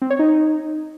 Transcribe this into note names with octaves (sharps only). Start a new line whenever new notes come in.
C4
C#5
D#4